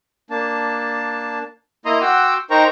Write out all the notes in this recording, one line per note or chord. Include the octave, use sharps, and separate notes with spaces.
A#3 D4 A5
A#3 E4 D#5 A#5 C6 D#6
F#4 F#5 G5 C6 D6 E6
D#4 A#4 C5 G5 A#5 C#6